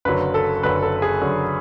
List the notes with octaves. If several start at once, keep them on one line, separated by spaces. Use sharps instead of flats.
F#1 F#2 D3 F#3 B4
A4
F#1 F#2 D3 F#3 B4
A4
G#4
F#1 F#2 D3 F#3